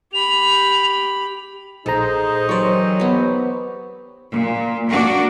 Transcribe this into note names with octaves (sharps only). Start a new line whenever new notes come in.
G4 B5 F7
A#1 D#4 G#4 A4 C5 A#5
D#3 E3 F#3 G4 C5 D5 C#6
B3 G4
A#2
A#3 D4 F#4